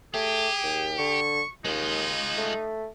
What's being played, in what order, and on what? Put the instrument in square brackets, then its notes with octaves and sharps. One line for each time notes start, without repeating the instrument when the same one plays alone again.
[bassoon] A3 [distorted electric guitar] G4 [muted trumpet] G#4
[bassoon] D#2
[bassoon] D3 [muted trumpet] C#6
[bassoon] D#2 [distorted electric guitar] G#3 F4 [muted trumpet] D#4
[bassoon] A3